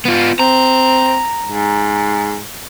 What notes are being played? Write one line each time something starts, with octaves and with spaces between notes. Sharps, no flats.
B3 F4
C4 A#5
G#2